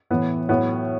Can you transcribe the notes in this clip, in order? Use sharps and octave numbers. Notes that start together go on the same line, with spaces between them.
A2 E3 B3
A2 F#3 B3